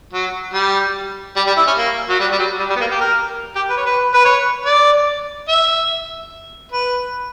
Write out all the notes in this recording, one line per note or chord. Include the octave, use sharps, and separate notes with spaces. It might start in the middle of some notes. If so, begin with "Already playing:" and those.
F#3
G3
G3
G3
E4
C#4
A#3
F#3
G3
G3
F#3
G3
G3
B3
A#3
G4
A#4
G4
B4
C#5
B4
B4
C#5
D5
E5
B4